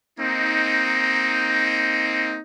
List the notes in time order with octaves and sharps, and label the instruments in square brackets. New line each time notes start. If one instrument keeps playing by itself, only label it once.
[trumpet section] A#3 C4 D#4